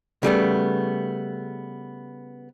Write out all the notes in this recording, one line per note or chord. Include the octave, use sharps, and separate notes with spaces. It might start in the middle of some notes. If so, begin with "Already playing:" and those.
C#3 G3 A3 B3